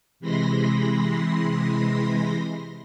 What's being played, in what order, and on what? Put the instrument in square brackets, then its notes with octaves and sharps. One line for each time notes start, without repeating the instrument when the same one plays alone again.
[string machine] C3 E3 G#3 B5 C6 A#6